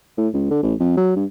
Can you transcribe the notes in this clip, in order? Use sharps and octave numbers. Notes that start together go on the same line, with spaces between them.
A2
C#2
D3
A1
F2
F#3
G2